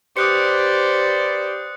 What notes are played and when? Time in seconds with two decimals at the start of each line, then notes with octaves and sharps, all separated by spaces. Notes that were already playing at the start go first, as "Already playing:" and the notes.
0.17 G4 B4 C5 D5 D#6 F#6 C#7